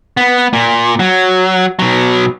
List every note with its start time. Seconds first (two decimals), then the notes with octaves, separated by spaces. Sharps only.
0.17 B3
0.53 A#2
0.99 F#3
1.79 B2 F#3